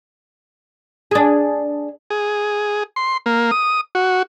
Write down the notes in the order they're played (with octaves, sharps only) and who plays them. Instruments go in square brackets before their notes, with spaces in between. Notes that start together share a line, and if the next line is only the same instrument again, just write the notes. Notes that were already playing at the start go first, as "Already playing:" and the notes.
[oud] D4 G#4
[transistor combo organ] G#4
C6
A#3
D#6
F#4